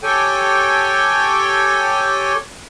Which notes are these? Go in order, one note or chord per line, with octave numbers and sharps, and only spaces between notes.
G4 A4 C#5 G5 G#5